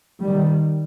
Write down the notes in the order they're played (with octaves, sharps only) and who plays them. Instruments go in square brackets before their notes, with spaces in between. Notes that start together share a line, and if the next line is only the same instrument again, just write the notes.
[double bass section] D#3 G3